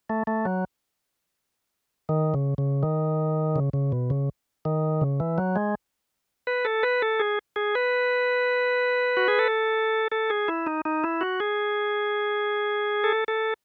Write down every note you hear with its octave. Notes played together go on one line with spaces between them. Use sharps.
A3
A3
F#3
D#3
C#3
C#3
D#3
C#3
C#3
B2
C#3
D#3
C#3
E3
F#3
G#3
B4
A4
B4
A4
G#4
G#4
B4
F#4
G#4
A4
A4
G#4
E4
D#4
D#4
E4
F#4
G#4
A4
A4